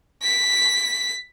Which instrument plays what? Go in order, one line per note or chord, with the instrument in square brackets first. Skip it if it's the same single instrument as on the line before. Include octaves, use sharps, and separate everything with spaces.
[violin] B6